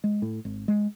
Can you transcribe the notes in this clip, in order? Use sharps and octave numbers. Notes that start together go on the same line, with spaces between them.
G#3
A2
G#1
G#3